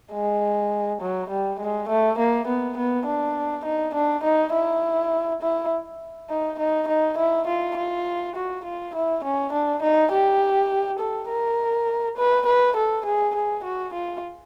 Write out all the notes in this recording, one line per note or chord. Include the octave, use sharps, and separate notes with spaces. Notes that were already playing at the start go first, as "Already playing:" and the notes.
G#3
F#3
G3
G#3
A3
A#3
B3
B3
D4
D#4
D4
D#4
E4
E4
D#4
D#4
D#4
E4
F4
F4
F#4
F4
E4
C#4
D4
D#4
G4
A4
A#4
B4
B4
A4
G#4
G#4
F#4
F4